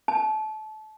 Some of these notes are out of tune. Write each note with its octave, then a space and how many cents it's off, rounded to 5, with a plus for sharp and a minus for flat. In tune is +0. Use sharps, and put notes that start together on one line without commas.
A5 -25